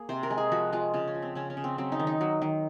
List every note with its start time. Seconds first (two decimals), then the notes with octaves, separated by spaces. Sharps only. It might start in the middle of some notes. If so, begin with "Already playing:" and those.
Already playing: A#3 G#4
0.09 C3 C5
0.23 A#4
0.30 G#3
0.38 G#4
0.52 F3 F#4
0.72 G#3 F4
0.94 C#3 F4
1.07 C#4
1.15 F3
1.22 C4
1.35 C#3 C#4
1.50 C#4
1.57 C#3
1.64 C4
1.78 F#3 C4
1.92 D#4
1.99 D#3
2.07 D#4
2.21 F#3
2.42 D#3